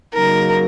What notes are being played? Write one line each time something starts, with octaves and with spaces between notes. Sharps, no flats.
C#3 F#3 A#3 D#4 A#4